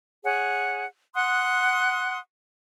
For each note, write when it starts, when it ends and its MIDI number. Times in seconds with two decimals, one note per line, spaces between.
0.24 0.85 68
0.24 0.85 73
0.24 0.85 78
1.15 2.17 78
1.15 2.17 84
1.15 2.17 87
1.15 2.17 90